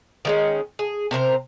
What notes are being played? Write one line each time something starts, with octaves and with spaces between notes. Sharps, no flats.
D#3 G#3 C#4
G#4
C3 A#4 C5 A#5